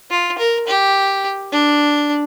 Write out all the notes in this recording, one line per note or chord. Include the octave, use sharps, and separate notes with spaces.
F4
A#4
G4
D4